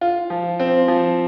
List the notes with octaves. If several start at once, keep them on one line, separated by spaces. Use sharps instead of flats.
F4
F3
C4
F3